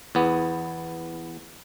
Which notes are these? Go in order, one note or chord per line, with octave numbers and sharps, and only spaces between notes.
E2 B3